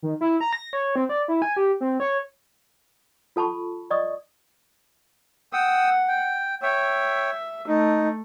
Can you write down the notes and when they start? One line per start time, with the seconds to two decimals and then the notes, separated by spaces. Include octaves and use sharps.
0.03 D#3
0.21 E4
0.41 A#5
0.53 A#6
0.73 C#5
0.96 C4
1.09 D5
1.28 E4
1.42 G#5
1.57 G4
1.81 C4
2.00 C#5
3.36 F4 A4 A5 B5 C#6
3.91 D5 D#5 C#6 D#6
5.53 F#5 G5 D#6 E6
6.08 G5
6.62 C#5 E5 G5
7.68 A3 D#4